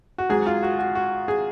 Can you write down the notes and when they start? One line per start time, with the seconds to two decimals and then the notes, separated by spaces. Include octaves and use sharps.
0.18 F#4
0.29 G#2 F#3 G#4
0.46 F4
0.63 F#4
0.79 F#4
0.95 F#4
1.28 G#4